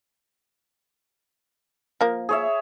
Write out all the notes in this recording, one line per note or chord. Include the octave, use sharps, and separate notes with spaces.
F3 A#3
G#4 C#5 E5